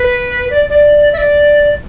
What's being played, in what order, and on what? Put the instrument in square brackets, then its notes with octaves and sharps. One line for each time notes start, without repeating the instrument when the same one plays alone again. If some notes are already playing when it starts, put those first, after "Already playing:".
Already playing: [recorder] B4
D5
D5
E5
D5